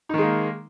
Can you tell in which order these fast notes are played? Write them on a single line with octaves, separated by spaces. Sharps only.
D#4 D#3 G#3 A#3